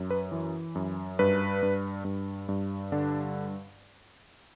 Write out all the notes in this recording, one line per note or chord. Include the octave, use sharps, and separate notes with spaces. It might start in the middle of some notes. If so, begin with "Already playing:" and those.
Already playing: F#2
B4
E3
F#2
G2 B4
G2
G2
G2
D3 D4